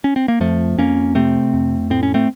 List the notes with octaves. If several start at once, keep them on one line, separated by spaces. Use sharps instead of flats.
C#4
C4
A#3
F2 F3 A3
F2 A#3 C#4
C3 A3 C4
F2
A2 C4
C#4
A3 C4